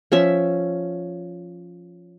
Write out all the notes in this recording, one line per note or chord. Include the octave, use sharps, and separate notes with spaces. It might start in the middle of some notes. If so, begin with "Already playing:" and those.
F3 C#4 E5